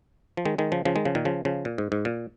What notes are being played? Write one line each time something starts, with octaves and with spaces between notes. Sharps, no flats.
F3
D#3 G#3
D#3 G#3
C#3 F3
C#3 F3
D#3 G#3
C#3 F3
A#2 D#3
C#3 F3
C#3 F3
A#2
G#2
G#2
A#2